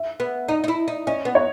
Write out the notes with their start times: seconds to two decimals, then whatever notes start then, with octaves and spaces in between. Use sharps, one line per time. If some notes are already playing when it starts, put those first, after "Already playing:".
Already playing: E5
0.20 B3
0.48 D#4 D#5
0.64 D#4
0.68 E4
0.88 D#4
1.07 C#4 D#5
1.25 B3
1.35 C#5